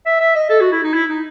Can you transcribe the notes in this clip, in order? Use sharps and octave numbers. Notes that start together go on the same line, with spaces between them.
E5
E5
D#5
A4
F#4
E4
D#4
E4
D#4